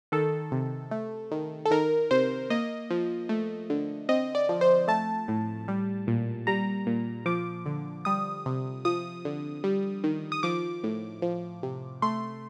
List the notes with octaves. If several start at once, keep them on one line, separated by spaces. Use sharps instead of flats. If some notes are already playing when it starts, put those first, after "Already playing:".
D#3 A4
C3
A3
D#3
A4
D#3 A#4
C3 C5
A#3 D#5
F3
A3
D3
C4 D#5
D5
F3
C5
A3 A5
A2
G3
A#2
G3 A#5
A#2
F3 D6
D3
G3 D#6
C3
F3 D#6
D3
G3
D#3
D#6
F3 D6
A2
F3
C3
A3 C6